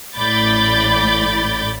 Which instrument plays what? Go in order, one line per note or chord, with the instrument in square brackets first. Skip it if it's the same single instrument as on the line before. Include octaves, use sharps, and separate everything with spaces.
[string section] A1 A2 D5 B5 G6 A6